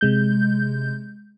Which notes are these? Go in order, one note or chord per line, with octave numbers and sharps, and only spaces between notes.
C3 G#3 G6